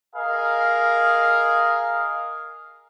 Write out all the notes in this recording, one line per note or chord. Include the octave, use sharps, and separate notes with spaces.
G#4 A#4 D#5 F5